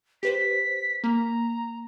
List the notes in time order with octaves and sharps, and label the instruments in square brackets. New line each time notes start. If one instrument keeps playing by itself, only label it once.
[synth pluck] G4 B4 C5 [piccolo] B6
[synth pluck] A#3 [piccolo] A#5